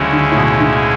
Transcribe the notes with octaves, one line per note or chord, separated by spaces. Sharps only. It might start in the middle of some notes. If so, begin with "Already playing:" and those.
Already playing: D2 C#3 F#3 G#3 C#4 E4
D3
A2
B2
D3